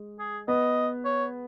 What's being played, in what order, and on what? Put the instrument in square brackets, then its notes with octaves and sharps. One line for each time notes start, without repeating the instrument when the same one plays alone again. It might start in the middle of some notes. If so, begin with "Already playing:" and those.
Already playing: [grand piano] G#3
[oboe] G#4
[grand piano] B3 [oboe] D#5
[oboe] C#5